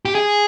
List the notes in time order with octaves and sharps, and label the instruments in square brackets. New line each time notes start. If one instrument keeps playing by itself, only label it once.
[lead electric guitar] G4
G#4